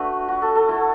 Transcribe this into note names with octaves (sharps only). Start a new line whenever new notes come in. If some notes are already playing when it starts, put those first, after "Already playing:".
Already playing: A3 D4 F#4 B4
F#4
A4
A4
A3 E4 A4